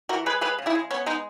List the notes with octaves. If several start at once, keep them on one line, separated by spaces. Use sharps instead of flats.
E3 F#4 A#4
G#3 G#4 B4
G#3 G#4 B4
C#3
E4 G#4
G#3
B3 C#4
G#3 D#4